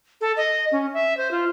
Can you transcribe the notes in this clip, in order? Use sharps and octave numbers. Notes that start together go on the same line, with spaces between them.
A4
D#5
C#4
E5
C5
F4